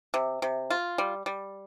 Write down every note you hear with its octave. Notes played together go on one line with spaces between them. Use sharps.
C3
C3
F4
G3
G3